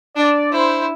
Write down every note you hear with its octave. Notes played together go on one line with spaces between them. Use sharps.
D4 D5
E4 C5